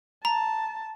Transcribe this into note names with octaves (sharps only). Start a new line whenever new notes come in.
A5 A#5